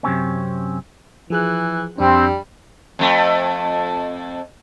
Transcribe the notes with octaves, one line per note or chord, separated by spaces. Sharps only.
F#2 C3 C4 C#4
E3 F3 G#4 F#6
F2 G3 C4 D4
F2 A3